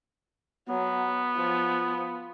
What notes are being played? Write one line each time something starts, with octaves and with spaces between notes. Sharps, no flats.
F#3 B3
F3